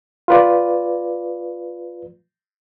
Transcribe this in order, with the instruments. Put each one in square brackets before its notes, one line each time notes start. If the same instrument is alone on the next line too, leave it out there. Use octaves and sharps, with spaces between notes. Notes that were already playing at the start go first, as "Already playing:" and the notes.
[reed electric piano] F4 B4 D5